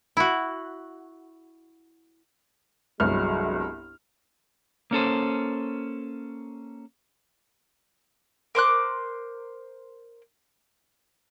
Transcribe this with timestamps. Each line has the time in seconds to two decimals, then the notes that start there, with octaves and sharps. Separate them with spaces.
0.17 E4 F#4
3.00 G1 C2 F#3 G#3 F6
4.91 A#3 C#4 A4 C5
8.55 A#4 C5 D6 F#6